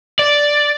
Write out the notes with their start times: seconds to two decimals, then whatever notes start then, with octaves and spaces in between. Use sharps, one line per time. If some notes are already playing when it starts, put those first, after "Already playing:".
0.19 D5